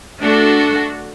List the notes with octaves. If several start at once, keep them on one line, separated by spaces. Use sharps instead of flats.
A3 D4 F#4 A4